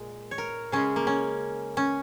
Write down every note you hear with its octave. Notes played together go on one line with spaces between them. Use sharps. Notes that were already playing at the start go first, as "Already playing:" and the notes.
Already playing: A#2 G#3
C#5
A#4
C#3 G#3 C#4
A#3
C#4
C#4